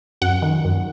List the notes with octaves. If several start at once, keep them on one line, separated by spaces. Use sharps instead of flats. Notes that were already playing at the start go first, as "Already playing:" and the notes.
F#2 F#5
D#3
F#2